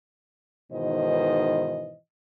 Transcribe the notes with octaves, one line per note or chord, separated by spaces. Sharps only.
G#2 B2 D#3 E3 C5 D#5